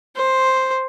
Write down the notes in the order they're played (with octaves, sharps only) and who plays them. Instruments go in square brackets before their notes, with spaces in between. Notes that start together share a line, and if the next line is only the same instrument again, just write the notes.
[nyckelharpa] C5